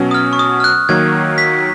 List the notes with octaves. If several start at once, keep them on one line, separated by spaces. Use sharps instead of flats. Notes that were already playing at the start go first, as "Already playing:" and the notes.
Already playing: B2 F#3 C#4
D#6
F6
C#6
D#6
F6
F#6
D#3 F#3 A#3 G#6
B6